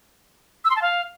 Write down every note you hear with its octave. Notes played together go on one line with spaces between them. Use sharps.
E6
C6
A5
F5